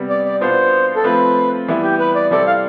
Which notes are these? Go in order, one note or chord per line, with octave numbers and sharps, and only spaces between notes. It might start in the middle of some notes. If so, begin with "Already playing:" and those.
Already playing: C3 G3 B3
D5
D5
B2 B3 D4 F4 C5
A4
F3 A3 C4 F4 B4
E3 G3 B3 E4
G4
B4
D5
C3 G3 C4 E4 A4 D5
F5